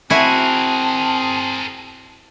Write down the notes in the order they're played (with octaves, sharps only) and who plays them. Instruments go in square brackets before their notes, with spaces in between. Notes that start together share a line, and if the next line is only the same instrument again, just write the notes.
[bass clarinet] C4 [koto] E4 F#4 G#5 [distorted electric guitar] G#4 A#4 [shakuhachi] A5